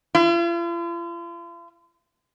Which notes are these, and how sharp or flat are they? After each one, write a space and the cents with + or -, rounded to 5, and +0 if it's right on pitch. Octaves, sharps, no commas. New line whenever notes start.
F4 -45